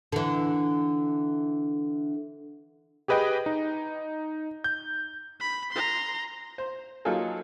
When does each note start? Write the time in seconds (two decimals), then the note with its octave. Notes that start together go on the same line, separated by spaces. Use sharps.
0.12 D3 E3
3.08 G4 G#4 B4 D#5 G5
3.46 D#4
4.64 G6
5.40 B5
5.72 A#5 C6
6.58 C5
7.05 F#3 A#3 D#4 F4 G#4 A4